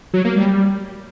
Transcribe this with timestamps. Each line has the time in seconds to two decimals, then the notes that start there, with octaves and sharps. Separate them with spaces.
0.14 F#3
0.25 A#3
0.36 G3